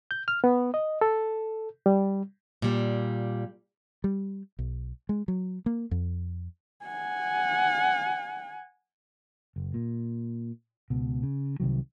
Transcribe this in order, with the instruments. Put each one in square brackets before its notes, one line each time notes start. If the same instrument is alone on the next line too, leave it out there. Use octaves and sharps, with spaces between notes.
[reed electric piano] G6
F6
B3
D#5
A4
G3
[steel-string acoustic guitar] A#2 G3
[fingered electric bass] G3
B1
G#3
F#3
A#3
F2
[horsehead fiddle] F#5 G#5
[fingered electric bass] F#1
A#2
C#2 B2
C#3
C2 C3 D#3 F#3